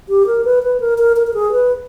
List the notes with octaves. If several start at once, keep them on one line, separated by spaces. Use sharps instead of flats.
G4
A#4
B4
B4
A#4
A#4
A#4
A#4
G#4
B4